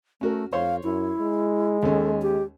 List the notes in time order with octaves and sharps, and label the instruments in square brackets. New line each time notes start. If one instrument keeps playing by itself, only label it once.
[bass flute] A3 [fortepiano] C#4 F#4 A#4
[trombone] F2 [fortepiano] C5 C#5 C6 [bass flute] F5
[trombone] F#2 [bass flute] E4
[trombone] G#3
[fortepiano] D#2 C#4 [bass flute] A4
[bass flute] G4